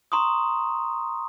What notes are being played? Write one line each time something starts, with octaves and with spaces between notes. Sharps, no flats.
A#5 C6 C#6 D#6